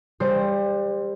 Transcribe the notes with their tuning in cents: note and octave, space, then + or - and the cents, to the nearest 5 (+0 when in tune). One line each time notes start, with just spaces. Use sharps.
G3 +25 C5 +0